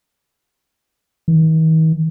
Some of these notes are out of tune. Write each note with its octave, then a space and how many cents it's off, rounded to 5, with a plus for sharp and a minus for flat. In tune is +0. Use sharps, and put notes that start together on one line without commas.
D#3 +45